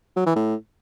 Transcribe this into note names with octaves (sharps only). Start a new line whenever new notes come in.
F#3
E3
A2